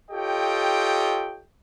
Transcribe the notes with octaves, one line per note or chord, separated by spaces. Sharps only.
F4 G4 A4 C#5 D#5 G5